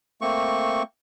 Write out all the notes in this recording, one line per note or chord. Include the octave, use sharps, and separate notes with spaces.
A3 A#3 C4 C#6